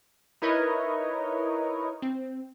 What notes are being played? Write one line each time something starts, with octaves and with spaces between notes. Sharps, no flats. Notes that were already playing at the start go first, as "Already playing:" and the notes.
D#4 E4 A#4 B4 C#5 D#5
C4